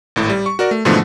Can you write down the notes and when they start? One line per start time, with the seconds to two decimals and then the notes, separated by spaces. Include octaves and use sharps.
0.16 G#1 A2
0.30 G3
0.46 C#6
0.59 F#4 A#4 D5
0.71 A3
0.85 G#2 B2 D3 E3 F3 A3